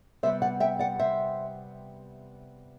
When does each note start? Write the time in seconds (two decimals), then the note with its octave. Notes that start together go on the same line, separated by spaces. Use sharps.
0.23 C3 G3 B3 C5 E5
0.42 D5 F#5
0.60 E5 G5
0.79 D5 F#5
0.99 C5 E5